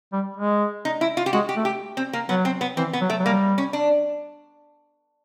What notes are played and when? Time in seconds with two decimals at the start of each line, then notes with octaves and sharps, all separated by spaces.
0.13 G3
0.37 G#3
0.85 D#4
1.01 E4
1.17 F4
1.26 G4
1.33 G#3 F#4
1.49 G4
1.57 A3
1.65 G4
1.97 C4
2.13 A#3
2.29 F#3 B3
2.45 C4
2.61 B3
2.77 E3 C4
2.93 B3
3.01 F#3
3.10 A3
3.20 F#3
3.25 G3 A#3
3.58 C#4
3.73 D4